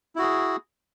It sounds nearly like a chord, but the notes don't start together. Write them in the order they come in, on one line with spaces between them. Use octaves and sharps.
E4 F#4 G#4